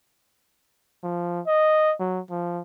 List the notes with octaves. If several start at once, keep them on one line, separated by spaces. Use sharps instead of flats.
F3
D#5
F#3
F3